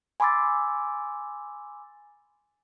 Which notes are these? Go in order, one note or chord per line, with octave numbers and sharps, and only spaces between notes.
G#5 B5 C6 D6 E6 A6